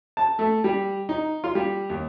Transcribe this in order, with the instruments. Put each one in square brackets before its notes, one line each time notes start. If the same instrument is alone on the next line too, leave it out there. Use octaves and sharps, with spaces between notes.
[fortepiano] A5
A3
G3
D#4
F4
G3
D#2